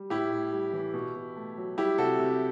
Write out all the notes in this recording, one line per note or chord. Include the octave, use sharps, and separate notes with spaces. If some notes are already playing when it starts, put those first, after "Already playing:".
Already playing: G3
A2 E4 G4
A2
G3
E3
B2
B2
A3
F#3
G3 E4 G4
C3 F#4 A4
C3